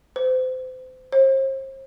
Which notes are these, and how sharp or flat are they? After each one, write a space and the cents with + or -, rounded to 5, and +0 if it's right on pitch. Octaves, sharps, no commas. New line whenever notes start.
C5 -30
C5 +40